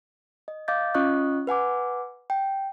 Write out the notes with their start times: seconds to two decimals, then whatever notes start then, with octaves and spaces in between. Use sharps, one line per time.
0.48 D#5
0.68 D#5 F5 D6 G6 A6
0.95 C#4 F4 D#5 C#6 D#6 F#6
1.47 B4 F#5 G#5 D6
2.30 G5